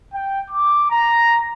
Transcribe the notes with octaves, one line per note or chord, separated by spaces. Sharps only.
G5
D6
A#5